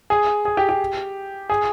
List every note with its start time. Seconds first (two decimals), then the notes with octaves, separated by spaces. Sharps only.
0.10 G#4
0.45 G#4
0.57 G4
0.69 G4
1.50 G#4